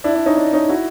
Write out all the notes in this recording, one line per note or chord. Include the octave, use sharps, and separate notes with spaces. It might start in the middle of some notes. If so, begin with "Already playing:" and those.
D4 E4
D4
C#4 D#4
D4
C#4 D#4
E4 F#4